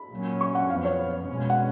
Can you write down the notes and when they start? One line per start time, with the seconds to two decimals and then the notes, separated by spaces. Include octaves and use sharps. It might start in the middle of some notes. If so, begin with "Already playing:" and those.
Already playing: B5
0.11 A#2 F#3 C#4
0.41 C#6
0.55 F#5
0.70 F2 F3 B3 F5
0.85 C#5
1.28 B2 G#3 C#4
1.50 F#5